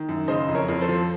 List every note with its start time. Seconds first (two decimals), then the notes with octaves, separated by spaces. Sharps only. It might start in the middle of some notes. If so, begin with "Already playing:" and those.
Already playing: D#3
0.09 F#2
0.28 C#3 C5 D#5
0.48 F2
0.55 A#4 C#5
0.68 F2
0.81 A4 C5
0.89 F3